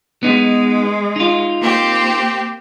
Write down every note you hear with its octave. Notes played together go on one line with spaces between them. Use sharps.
G#3 B3 D#4
D#4 F4
A#3 C4 G4